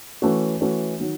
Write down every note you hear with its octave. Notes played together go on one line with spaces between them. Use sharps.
E3 A3 C#4 F#4
E3 A3 C#4 F#4
D#3 F#3